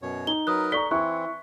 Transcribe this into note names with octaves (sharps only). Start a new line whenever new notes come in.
F#2 B2 C#5
D#4 G7
F#3 A#4 B4 D#6 F#6
A4 D5 A#5 C#6 B6 G7
E3 C4 E4 C#6 F#6